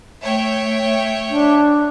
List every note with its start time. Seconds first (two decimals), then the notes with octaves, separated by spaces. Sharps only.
0.24 A3 C#5 E5 G5
1.30 D4